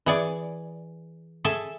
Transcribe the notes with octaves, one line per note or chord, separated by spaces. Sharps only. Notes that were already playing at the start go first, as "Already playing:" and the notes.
E3 G#4 D5
G#4 A4 E5